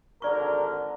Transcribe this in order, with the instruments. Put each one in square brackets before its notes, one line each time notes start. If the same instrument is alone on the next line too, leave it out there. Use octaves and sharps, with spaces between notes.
[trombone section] G#1 D3 A#4 [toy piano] D5 C#6